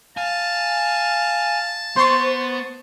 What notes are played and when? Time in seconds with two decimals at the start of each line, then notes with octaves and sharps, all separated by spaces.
0.17 F5 G#5 A5
1.96 B3 C5 C6 C#6